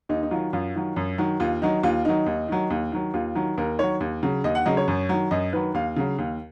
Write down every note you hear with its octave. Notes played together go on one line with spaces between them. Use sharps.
D#2 D#4
D#4
D#3 F#3 F4
F#2 F4
D#3 F#3
F#2
D#3 F#3
D#2 F4
D#3 F#3 D#4
D#2 F4
D#3 F#3 D#4
D#2
D#3 F#3
D#2
D#3 F#3
D#2 F4
D#3 F#3
D#2 A#4
D#3 F#3 C#5
D#2
C#3 F#3
D#2 D#5
F#5
C#3 F#3 D#5
C#5
F#2
D#3 F#3
F#2 D#5
D#3 F#3 B4
D#2 F5
C#3 F#3
D#2